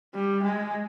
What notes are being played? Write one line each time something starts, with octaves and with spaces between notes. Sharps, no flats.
G3
G#3